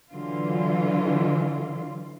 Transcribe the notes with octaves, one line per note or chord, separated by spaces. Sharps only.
D3 E3 F#3 F4